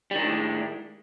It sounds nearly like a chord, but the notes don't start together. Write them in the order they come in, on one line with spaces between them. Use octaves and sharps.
G3 D#3 D4 A2 G#3